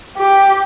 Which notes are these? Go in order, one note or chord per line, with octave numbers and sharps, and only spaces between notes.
G4